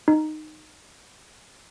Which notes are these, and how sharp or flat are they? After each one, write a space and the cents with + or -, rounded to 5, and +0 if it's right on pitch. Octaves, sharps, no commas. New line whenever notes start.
D#4 -10